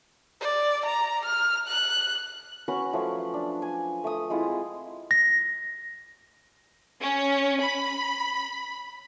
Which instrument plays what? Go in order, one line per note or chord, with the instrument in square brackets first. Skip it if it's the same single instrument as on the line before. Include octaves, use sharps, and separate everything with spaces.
[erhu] D5
A#5
F6
F#6
[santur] C#4 F#4 B4 C#5
F3 F#3 A3
D4
G#5
A3 D#6
G#3 C4 E4 F4
[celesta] A#6
[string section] C#4
B5